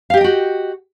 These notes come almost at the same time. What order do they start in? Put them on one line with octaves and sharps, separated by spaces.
F5 G4 D#5 G5 F#4